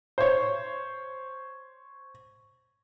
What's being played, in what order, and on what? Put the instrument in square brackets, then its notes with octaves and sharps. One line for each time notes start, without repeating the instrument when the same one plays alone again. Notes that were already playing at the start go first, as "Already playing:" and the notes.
[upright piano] C5 C#5